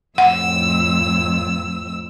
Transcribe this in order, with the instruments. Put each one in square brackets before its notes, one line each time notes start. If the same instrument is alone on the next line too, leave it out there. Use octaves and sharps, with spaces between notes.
[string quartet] F2 A2 E6 [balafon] F#5